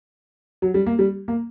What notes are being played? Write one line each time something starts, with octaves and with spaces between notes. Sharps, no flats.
F#3
G3
A#3
G3
A#3